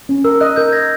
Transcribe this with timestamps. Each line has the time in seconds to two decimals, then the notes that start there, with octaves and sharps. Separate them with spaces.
0.09 C#4
0.24 A#4 E6
0.41 D#5 F#6
0.56 A#4 G6
0.72 D#5 G#6 A#6